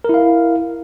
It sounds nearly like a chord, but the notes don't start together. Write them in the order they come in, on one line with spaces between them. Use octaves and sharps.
A#4 E4 F5